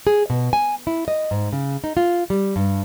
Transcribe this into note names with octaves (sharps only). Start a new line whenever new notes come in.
G#4
B2
G#5
E4
D#5
G#2
C#3
D#4
F4
G3
G2